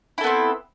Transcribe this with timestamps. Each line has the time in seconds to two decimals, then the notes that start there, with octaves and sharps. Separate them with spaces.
0.18 E4
0.21 A4
0.24 B3
0.27 C4